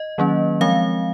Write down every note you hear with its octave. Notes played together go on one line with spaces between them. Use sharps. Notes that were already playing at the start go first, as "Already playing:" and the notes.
Already playing: D#5
D#3 F#3 A#3 C#4
F3 G#3 C4 F5